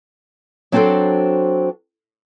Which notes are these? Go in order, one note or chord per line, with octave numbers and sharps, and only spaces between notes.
F#3 C4 D4 F#4 A4 C5